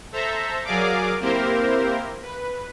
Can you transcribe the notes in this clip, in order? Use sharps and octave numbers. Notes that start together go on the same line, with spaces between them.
A4 C5 E5 A#5
F#3 G#4 A#4 D5 F5 D6
A#3 C4 E4 G4 A#4 C5
B4